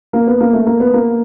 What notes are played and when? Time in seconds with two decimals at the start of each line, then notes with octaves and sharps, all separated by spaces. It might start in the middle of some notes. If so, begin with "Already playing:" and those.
0.13 A#3
0.27 B3
0.40 A#3
0.53 A3
0.66 A#3
0.80 B3
0.94 A#3